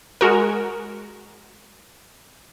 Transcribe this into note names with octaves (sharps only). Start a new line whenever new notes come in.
G#3 F#4 A#4